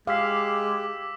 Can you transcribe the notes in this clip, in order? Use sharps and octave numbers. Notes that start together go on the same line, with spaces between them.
G#3 G4 F5 D6 E6 B6